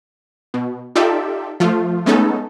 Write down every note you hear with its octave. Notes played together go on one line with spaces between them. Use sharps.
B2
D#4 F4 G4 A4 D5 E5
F3 A3 F4
G#3 A3 B3 C#4 D#4 A4